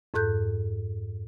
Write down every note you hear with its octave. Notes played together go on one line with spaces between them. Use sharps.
F2 G#2 A4 F#6 G6